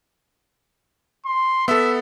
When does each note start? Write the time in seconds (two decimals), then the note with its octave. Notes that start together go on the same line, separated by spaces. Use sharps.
1.26 C6
1.68 B3 A4 E5